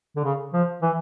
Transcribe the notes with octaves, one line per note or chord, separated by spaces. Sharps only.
D3
C#3
F3
E3